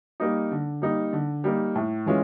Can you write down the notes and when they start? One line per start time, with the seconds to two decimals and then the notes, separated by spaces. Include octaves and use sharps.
0.20 G3 A#3 D#4
0.51 D3
0.82 G3 A#3 D#4
1.13 D3
1.44 G3 A#3 D#4
1.75 A2
2.06 E3 G#3 C#4 F4